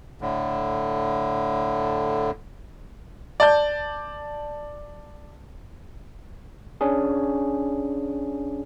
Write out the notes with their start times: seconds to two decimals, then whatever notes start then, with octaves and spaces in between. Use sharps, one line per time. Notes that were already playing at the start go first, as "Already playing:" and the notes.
0.21 A2 D3
3.40 D5 A5 G6
6.81 C#4 D4 G#4